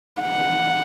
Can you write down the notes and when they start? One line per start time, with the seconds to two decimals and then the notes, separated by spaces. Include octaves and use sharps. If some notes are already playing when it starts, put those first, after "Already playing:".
0.22 F#5